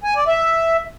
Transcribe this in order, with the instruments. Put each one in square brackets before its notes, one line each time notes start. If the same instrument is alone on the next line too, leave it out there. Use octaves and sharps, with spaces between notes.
[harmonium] G#5
D5
E5